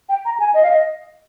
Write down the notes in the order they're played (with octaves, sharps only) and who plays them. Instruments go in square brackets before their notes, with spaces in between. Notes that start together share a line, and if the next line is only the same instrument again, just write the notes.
[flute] G5
A#5
G#5
D#5
F5
D#5